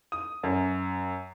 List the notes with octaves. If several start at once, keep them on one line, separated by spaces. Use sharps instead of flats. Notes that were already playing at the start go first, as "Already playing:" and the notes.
D#6
F#2